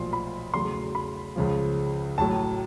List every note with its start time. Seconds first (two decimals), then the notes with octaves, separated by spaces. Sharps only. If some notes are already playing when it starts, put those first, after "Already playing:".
Already playing: B1 A#2 F3 A3 C6
0.13 B5
0.54 E2 C#3 F#3 A3 C6
0.95 B5
1.36 C#2 C#3 F3
2.18 A1 A2 F#3 A5